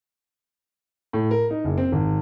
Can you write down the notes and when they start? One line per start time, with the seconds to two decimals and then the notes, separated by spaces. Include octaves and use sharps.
1.13 A2
1.31 A#4
1.50 D#4
1.65 F#1
1.78 C4
1.92 G#1